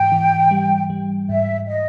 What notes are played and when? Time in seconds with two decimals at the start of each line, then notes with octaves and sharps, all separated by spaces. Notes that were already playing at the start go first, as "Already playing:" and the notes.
Already playing: G#2 E3 G5
0.12 E3
0.51 G3
0.90 G3
1.29 G#2 E5
1.68 D#5